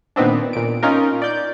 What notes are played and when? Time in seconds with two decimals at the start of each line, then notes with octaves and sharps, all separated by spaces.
0.16 A#2 D#3 B3 C4 D4
0.53 A#2 D7
0.83 C#4 D#4 F4 A#4
1.22 D5 G6